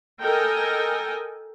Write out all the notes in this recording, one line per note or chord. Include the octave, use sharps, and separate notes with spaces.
A4 A#4 D#5 G5 G#5